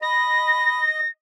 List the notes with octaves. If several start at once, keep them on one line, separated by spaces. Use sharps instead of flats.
D#5 B5 A#6